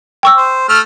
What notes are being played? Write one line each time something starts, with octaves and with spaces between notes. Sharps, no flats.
G5 C#6 E6
C5
A3 F6